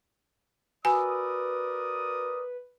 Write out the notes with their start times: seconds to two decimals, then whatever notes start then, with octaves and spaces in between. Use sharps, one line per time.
0.85 F#4 A#4 B4 D5 G#5 B5 D#6 E6